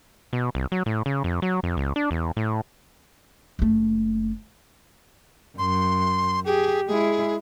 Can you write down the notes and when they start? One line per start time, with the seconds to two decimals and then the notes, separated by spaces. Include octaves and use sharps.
0.33 B2
0.55 C2
0.72 F#3
0.86 A2
1.06 C#3
1.24 F2
1.42 F#3
1.63 F2
1.77 C#2
1.96 D4
2.11 E2
2.37 A2
3.59 F#1 A3
5.58 F#2 C6
6.46 G4 G#4
6.88 G#3 E4 G#4